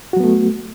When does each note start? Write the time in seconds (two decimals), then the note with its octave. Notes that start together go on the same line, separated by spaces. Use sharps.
0.13 F#4
0.17 F#3
0.20 B3
0.24 A3